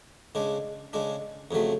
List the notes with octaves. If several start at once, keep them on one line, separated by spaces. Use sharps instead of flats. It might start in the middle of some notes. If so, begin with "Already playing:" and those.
C#3 G#3 D4
C#3 G#3 D4
F2 C#3 F#3 A3